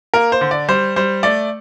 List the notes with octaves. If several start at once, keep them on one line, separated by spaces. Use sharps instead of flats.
A#3 A#4
C5
D3
D5
G3 C5
G3 C5
A3 D5